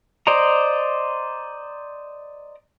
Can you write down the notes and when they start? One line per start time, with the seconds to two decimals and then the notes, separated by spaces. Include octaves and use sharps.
0.27 C5 D5 D#5 A#5